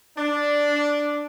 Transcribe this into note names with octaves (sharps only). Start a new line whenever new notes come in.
D4